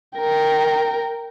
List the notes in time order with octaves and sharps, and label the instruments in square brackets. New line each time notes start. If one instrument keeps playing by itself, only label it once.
[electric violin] A#4 G5